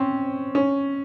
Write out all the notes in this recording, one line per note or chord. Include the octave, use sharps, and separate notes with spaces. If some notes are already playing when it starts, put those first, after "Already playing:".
Already playing: C4 C#4
C#4